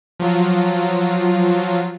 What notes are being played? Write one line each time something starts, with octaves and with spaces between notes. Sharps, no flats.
F3 F#3 F4